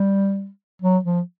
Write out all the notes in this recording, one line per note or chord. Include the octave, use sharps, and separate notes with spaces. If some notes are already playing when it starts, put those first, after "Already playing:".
Already playing: G3
F#3
F3